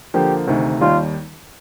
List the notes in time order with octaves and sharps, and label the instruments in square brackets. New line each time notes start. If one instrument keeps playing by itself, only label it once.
[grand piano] D3 F3 A#3 [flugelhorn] G4
[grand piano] D2 C3 D#3
[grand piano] D#2 D#3 G3 [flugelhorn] F4